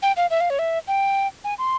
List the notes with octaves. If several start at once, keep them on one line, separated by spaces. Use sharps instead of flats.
G5
F5
E5
F5
C#5
E5
G5
G#5
C6